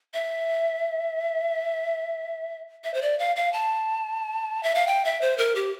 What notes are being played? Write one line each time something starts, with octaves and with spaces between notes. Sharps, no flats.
E5
E5
C5
D5
F5
F5
A5
E5
F5
G5
E5
C5
A#4
G4